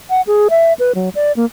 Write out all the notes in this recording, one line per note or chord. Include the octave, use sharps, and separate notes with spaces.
F#5
G#4
E5
B4
F#3
D5
A#3